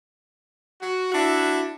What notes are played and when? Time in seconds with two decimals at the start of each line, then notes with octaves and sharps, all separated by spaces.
0.81 F#4
1.12 D4 E4 F#4 E5